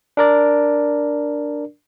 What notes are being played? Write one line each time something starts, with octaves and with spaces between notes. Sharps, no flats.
D4 A#4 D5